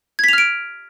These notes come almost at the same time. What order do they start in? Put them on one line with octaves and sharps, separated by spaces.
G#6 B6 F7 F6 D7